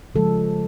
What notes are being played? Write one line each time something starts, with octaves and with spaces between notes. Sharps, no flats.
C#3 F3 G#3 A4